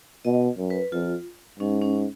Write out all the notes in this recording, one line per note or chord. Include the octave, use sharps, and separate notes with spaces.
B2 D#5
F#2
B4
F2 F4
G#2 C#4
C#4